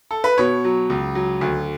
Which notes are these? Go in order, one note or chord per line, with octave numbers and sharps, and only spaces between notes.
A4
B4
B2 C#5
F#3
C#2
F#3
D2